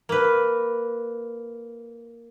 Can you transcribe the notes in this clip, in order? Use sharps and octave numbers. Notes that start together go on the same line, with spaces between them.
A#3 B4